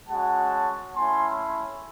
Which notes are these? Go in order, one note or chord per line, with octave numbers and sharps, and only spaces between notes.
G#3 C#4 F#4 F#5 A5
A3 C#4 E4 G#5 C6